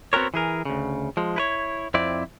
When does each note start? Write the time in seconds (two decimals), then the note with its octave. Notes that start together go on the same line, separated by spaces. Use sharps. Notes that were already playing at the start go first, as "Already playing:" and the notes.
0.13 B3 C4 F#4 G4 A#4 C#5
0.34 E3 G#4 A#4
0.65 D2 C#3
1.17 F3 G#3
1.36 E4 B4 C#5
1.94 F2 C4 E4 D5